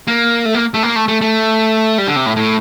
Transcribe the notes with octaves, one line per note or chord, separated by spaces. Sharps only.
A#3
A3
A#3
A3
A#3
A3
A3
A3
G3
D3
C3
A2
A2